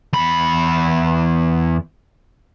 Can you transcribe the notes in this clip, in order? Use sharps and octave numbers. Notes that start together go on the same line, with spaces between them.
E2 B5